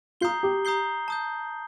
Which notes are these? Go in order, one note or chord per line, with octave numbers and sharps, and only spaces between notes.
F4 A#5 D#6 G6 C7 G7
G4
A#5 D#6 G6 C7 G7
A5 D#6 G6